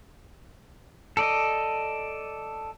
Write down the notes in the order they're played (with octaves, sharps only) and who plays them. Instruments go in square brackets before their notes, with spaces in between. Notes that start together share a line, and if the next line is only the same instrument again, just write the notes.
[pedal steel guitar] A4 D5 D#5